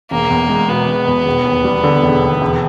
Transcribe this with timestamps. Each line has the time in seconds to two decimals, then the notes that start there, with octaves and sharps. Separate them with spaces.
0.11 E1 A#3
0.30 E2
0.49 G#3
0.69 B2 B3
0.87 E1
1.08 E2
1.26 E1
1.45 D#2
1.64 G3
1.84 D3
2.04 E1
2.23 D#2
2.42 E1